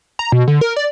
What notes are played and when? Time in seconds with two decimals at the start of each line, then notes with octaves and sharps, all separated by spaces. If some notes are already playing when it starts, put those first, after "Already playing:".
0.19 A#5
0.32 B2
0.47 D3
0.61 A#4
0.76 D5